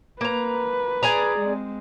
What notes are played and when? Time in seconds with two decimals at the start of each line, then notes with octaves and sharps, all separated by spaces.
0.21 A#3 B4 A#5
1.03 G#4 D5 A#5
1.39 G#3 C4